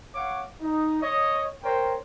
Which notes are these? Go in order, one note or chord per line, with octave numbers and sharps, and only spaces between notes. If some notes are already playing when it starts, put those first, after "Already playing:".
C#5 F5 F#5 D6
D#4
C#5 D#5
A#4 C5 C#5 G5